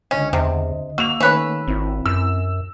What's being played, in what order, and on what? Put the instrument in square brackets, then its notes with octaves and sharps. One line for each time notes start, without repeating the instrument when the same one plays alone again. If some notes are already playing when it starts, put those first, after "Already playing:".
[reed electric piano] C#2 D3 D#5 [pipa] C#4
[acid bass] E2 [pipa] C3
[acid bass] A#3 [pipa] F#4 [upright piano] E6 F7
[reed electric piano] D#3 A3 [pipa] C#4 B4 C#5
[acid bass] G#1 [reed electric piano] C4 E4
[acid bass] F#2 [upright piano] E6